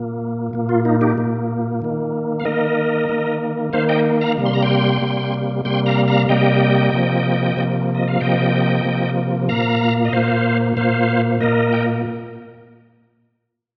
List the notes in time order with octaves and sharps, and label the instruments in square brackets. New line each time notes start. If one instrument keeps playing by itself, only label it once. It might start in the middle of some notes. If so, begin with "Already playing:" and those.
Already playing: [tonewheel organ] A#2 A#3
A#2 A#3
F4
D#4
D#4 G4
A#2 A#3
D#3 A#3
F5
D#3 A#3 A#4 D#5
D#3 A#3
D#3 A#3 C5 F5
D#5 G5
F5 A#5
C3 G3 A#3
C6
A#5
G5 C6
C3 G3 A#3
C3 G3 A#3 G5 C6
F5 A#5
F5 A#5
C3 G3 A#3 D#5 G5
C3 F3 A#3
C3 F3 A#3
D#5
F5
C3 F3 A#3 D#5 G5
C3 F3 A#3
A#2 A#3 F5 A#5
D#5
A#2 A#3 C5 F5
A#2 A#3 C5 F5
A#2 A#3 A#4 D#5
G5